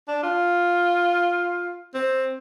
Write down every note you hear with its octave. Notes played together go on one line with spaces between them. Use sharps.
D4
F4
C4